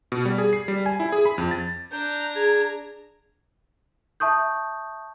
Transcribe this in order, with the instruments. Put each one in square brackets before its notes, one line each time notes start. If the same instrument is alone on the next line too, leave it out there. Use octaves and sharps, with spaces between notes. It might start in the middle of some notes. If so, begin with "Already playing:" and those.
[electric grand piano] B2
G3
G#4
C7
G3
G#5
E4
G#4
B5
F2
A6
[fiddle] D4 [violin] A#5 [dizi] G6
[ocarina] G#4 [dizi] G#6
[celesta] E5 A5 C#6 D#6 G6